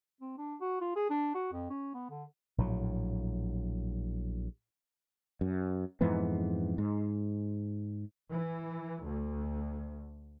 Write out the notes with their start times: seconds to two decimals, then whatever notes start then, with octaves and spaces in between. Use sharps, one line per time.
0.21 C4
0.38 D4
0.61 F#4
0.81 F4
0.96 G#4
1.10 D4
1.34 F#4
1.52 F2
1.70 C#4
1.94 B3
2.10 D3
2.58 A#1 A2 F3 F#3
5.41 F#2
6.01 F2 G#2 E3 B3
6.78 G#2
8.30 E3
9.04 D2